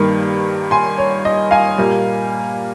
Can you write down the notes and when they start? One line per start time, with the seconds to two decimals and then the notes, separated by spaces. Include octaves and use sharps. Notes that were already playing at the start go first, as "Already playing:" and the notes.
Already playing: G2 D#3 A#3
0.71 G#5 C6
0.98 C#5
1.25 D#5
1.51 F5 G#5
1.77 A#2 G3 A#3